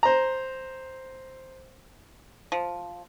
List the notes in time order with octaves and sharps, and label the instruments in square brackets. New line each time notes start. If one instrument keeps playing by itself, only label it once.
[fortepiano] C5 A#5
[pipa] F3